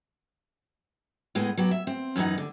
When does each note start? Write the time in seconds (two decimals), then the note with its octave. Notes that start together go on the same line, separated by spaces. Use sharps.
1.35 A2 G#3 B3 G#4
1.58 F#3 B3 G4
1.71 E5
1.87 C4
2.16 F#2 E3 F3 D#4 F#5
2.38 D3